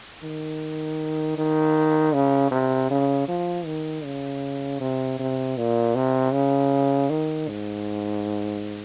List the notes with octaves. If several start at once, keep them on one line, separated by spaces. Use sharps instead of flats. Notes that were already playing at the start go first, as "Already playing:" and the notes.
D#3
D#3
C#3
C3
C#3
F3
D#3
C#3
C3
C3
A#2
C3
C#3
D#3
G#2